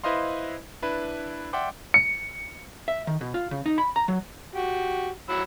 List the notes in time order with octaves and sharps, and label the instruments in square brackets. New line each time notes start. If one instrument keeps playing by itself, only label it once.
[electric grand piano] E4 B4 C5 D#5 F5 C6
D4 E4 B4
D5 E5 F#5 G5 C6 D6
C#7
[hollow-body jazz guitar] E5
D#3
B2
F4
C#3
D#4
B5
A#5
F#3
[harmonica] F#4 G4
F#3 B5 E6